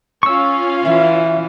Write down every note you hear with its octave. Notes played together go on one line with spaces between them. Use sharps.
C#4 F4 F5 C#6 E6
E3 E5